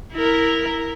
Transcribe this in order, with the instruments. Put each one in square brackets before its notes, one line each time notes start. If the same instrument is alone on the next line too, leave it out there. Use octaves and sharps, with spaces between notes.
[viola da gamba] E4 A#4